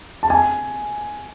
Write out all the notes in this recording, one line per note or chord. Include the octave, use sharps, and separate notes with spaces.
A5
G#5